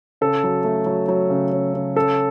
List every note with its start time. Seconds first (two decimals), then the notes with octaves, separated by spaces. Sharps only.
0.21 C#3 A4
0.44 F#3
0.64 A3
0.86 F#3
1.08 F#3
1.30 C#3
1.52 C#3
1.74 C#3
1.95 C#4 A4